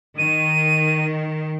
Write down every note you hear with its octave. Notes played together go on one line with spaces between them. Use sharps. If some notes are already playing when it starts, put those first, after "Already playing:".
D#3 D#7